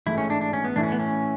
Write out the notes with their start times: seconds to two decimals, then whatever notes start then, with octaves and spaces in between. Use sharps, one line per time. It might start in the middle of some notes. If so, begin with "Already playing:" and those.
0.06 A1 G#2 E3 A3 E4
0.18 C#4
0.30 D4
0.41 D4
0.53 C#4
0.64 B3
0.76 A2 E3 A3 D4 E4
0.83 C#4
0.92 B3
1.00 C#4